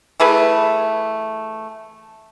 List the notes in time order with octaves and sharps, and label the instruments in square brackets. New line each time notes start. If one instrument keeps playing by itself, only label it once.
[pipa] E3 A3 G#4 B4